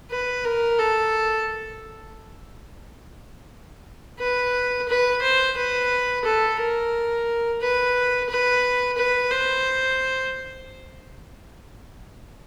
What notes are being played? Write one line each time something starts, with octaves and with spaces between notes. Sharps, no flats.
B4
A#4
A4
B4
B4
C5
B4
A4
A#4
B4
B4
B4
C5